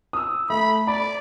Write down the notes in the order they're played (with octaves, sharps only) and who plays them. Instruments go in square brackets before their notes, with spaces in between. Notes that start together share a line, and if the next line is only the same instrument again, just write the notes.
[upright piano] D#6 E6
[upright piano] A3 [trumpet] B5
[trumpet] D5 [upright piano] B5